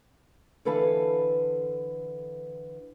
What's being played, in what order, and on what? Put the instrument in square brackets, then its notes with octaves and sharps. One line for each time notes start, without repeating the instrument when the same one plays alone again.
[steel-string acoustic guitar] D3 E3 A4 B4 F5 A5